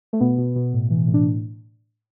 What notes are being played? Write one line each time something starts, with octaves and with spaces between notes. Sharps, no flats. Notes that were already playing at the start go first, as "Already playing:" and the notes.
A3
B2 B3
B2
B2
A2
E3
A2
D4